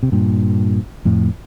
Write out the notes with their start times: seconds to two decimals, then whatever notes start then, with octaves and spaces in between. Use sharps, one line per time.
0.03 C3
0.12 G2 A#2
1.05 F2 A2